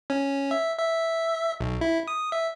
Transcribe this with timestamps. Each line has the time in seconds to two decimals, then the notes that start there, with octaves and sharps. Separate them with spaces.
0.10 C#4
0.51 E5
0.78 E5
1.61 B1
1.81 E4
2.08 D#6
2.32 E5